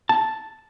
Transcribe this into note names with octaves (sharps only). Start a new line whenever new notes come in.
A5